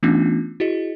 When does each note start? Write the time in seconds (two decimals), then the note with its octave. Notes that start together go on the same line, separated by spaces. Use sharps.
0.03 E3 A3 B3 C#4 D4 F4
0.60 E4 F#4 G#4 D#5